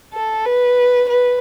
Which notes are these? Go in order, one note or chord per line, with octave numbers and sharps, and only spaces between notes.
A4
B4
B4